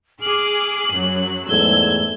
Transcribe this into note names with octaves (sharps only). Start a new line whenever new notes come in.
G#4 D6 F6 F#7
F#2 F#3
E2 G#2 A3 E6 G#6 G7